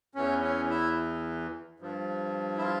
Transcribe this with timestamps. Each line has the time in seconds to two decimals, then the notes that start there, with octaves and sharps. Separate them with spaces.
0.15 E2 E3 C#4
0.42 C#4
0.70 E4
1.80 G2 F3
2.58 E4
2.62 F4